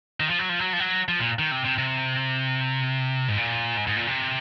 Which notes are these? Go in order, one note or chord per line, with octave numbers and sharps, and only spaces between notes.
D#3
F3
F#3
F3
F#3
F3
F#3
F3
A#2
D#3
C3
C3
C3
G#2
A#2
G#2
G#2
A#2
C3